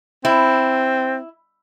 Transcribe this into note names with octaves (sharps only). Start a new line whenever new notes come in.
C4 E4